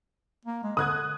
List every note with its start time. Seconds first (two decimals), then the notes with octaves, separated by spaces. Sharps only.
0.45 A#3
0.63 G#3
0.77 D3 D#6 F#6 G#6